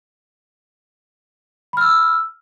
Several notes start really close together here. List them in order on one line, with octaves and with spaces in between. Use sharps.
B5 F6 E6